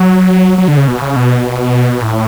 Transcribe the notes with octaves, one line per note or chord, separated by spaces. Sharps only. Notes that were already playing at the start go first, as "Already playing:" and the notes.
Already playing: F#3
F#3
D3
C#3
B2
C#3
B2
A2